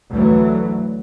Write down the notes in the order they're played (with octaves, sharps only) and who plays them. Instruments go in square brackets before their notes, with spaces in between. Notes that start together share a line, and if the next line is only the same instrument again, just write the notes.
[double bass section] D2 E3 F#3